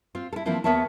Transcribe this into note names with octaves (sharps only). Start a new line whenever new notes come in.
C4 F4
E4 A4
E3 F3 A#3 C4 D4 E4
D#2 B3 A#4 C#5 E5 A5